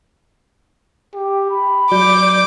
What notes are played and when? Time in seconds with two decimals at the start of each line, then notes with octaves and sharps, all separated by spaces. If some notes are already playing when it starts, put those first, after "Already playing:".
1.14 G4
1.51 B5
1.91 F#3 D5 D6 G6